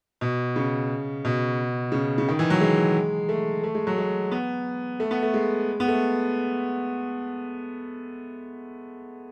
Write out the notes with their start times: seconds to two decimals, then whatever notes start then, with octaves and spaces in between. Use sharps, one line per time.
0.21 B2
0.56 C#3
1.25 B2
1.92 C#3
2.18 C#3
2.28 D#3
2.39 E3
2.50 F#3
2.61 G#3
3.29 A3
3.63 A3
3.75 G#3
3.87 F#3
3.98 G#3
4.31 B3
5.00 A3
5.11 B3
5.23 A3
5.34 G#3
5.80 B3
5.88 A3